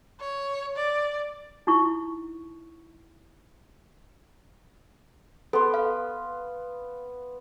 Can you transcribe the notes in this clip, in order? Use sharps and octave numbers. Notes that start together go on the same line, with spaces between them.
C#5
D5
D#4 E4 C#6
B3 A4 C6
F5